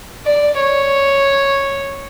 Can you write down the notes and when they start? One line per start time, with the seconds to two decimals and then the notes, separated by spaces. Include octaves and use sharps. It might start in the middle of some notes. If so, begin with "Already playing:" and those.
0.26 D5
0.59 C#5